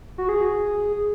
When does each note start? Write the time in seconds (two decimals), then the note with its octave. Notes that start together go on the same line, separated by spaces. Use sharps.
0.18 F#4
0.29 G#4